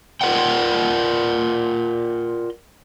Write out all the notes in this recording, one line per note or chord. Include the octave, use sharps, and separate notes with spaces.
F4 A#4 D5 F#5 G5